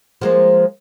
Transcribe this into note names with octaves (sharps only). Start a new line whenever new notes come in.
F3 G#3 A#3